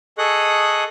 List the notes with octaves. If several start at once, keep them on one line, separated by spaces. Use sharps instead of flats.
G#4 A4 D#5 C#6 D#6 F#6